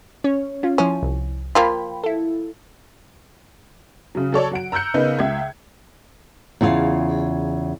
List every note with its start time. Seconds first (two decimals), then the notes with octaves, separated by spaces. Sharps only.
0.24 C#4 C#5
0.63 C#4 F4
0.78 F3 C#4 E4
1.03 C2
1.55 F3 A#3 F4 G5 B5
2.04 E4 A4
4.15 C#3 F#3
4.32 F#3 A4 C#5 D5
4.51 F#3 F#5 D7
4.72 A#5 E6 F#6 G6 C#7
4.94 C#3 B3 D#4 A#4 B4
5.19 C#2 E5 G#6
6.61 E2 C#3 F4 G#4 F5